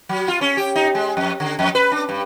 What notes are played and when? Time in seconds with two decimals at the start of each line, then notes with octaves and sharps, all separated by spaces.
0.09 F#3
0.28 F4
0.41 C#4
0.57 G4
0.75 D#4
0.95 G#3
1.17 F2
1.40 D3
1.59 F2
1.75 B4
1.92 D4
2.09 G2